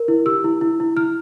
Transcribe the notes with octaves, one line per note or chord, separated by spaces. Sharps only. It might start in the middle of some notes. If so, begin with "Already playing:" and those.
Already playing: A#4
E4
G4 E6
E4
E4
E4
E4 F6